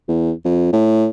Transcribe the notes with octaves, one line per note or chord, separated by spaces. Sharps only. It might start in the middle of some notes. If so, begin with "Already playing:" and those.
E2
F2
A2